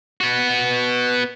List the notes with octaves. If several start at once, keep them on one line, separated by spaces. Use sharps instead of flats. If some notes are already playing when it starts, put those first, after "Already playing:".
B3 F#4